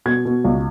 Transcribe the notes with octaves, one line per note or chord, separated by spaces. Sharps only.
B2 G#6
B2
C#2